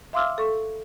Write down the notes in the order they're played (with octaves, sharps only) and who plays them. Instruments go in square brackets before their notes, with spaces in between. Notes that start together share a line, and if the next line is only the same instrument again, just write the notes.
[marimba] E5 F5 C6 D6 E6 F6
A4 C#6